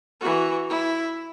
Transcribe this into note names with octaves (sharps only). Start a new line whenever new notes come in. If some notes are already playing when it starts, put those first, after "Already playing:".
E3 F#4
E4